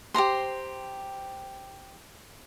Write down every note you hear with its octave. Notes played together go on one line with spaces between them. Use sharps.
G4 C5 A#5 C6